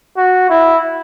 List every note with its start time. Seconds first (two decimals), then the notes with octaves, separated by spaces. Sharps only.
0.17 F#4
0.50 E4